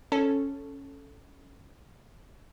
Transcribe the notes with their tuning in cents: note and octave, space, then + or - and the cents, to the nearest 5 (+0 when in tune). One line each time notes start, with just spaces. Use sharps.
C#4 +0 A4 +0